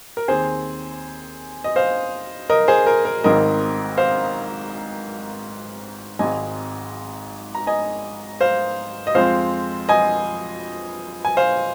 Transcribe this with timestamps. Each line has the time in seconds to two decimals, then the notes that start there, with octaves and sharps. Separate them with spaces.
0.17 A#4
0.28 D#2 D#3 C4 G#4 C5
1.64 D#5
1.76 C5 F5
2.50 A#4 D#5
2.68 G#4 C5
2.87 A#4
3.05 A#4
3.24 G#1 G#2 D#3 C4 A#4 D#5
3.98 C5 F5
6.19 G#1 G#2 G#3 C4 D#5 G#5
7.55 A#5
7.67 D#5 G#5
8.41 C5 F5
9.07 D#5
9.14 F2 F3 G#3 C4 C5 F5
9.89 D#5 G#5
11.25 G#5
11.37 C5 F5